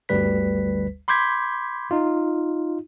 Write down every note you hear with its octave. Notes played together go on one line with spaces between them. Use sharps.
G1 D2 G3 B4 B6
B5 C6 D6 G6 G#6 B6
D#4 F4